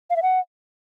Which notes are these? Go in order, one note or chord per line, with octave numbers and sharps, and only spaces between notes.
F5
E5
F#5